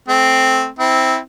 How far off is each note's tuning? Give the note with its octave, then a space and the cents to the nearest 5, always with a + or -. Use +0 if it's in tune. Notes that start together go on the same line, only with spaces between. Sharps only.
A3 -15 C4 +0
C4 +0 E4 -20